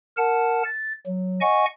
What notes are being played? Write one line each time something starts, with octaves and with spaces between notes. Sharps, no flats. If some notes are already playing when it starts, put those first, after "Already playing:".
A#4 F#5 A5
A6
F#3
D#5 F#5 G#5 C#6